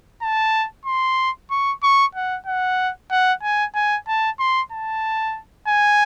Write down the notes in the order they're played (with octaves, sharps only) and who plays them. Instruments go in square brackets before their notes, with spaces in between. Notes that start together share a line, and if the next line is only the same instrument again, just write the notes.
[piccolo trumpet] A5
C6
C#6
C#6
F#5
F#5
F#5
G#5
G#5
A5
C6
A5
G#5